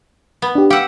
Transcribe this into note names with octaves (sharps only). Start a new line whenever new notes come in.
B3
D4 G4
G4 F5 F#5 E6